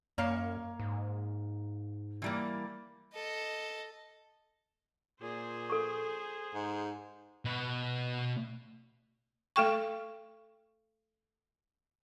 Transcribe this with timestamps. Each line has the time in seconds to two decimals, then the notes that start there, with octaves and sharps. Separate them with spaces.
0.18 F#2 A#3 C#5 F5
0.80 G#2
2.22 E3 G3 A#3
3.14 A4 D#5
5.22 A#2 G#4 C5
5.70 A4 C#6
6.54 G#2
7.45 B2 B4
9.56 A3 A4 G5 C#6